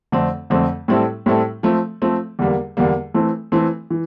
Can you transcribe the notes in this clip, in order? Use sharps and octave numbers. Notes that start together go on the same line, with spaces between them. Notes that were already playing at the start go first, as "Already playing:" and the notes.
F2 D3 A3 C4
F2 D3 A3 C4
A2 G3 C4 E4 A4
A2 G3 C4 E4 A4
F3 A3 C4
F3 A3 C4
E2 D3 G3 A#3
E2 D3 G3 A#3
E3 A3 C4
E3 A3 C4
E3